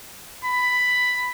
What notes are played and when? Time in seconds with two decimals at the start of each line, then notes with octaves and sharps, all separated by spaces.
0.44 B5